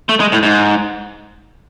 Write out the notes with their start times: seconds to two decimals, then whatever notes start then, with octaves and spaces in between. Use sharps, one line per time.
0.09 A3
0.20 G#3
0.32 A2
0.43 G#2